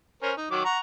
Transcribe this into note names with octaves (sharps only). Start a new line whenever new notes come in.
C#4 A#4 C5
D#4
D#3 F#3 D6
F#5 A#5 C#6